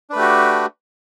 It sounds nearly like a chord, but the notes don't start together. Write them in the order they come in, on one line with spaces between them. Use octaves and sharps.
D4 B4 A3 G4 F#4